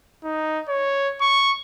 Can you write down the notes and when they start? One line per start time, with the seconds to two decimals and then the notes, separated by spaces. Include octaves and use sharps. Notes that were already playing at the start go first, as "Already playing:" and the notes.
0.24 D#4
0.69 C#5
1.21 C#6